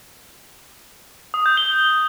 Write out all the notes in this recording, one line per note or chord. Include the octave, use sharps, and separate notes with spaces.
D#6
G6
G7